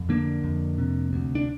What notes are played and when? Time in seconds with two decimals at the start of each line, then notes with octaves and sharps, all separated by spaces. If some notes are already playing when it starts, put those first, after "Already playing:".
Already playing: F2
0.09 D3 A#3 D4
0.44 F2
0.78 C3
1.13 D2
1.35 D4